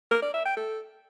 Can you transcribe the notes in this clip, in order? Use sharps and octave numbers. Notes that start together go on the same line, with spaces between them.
A#4
D5
E5
G5
A4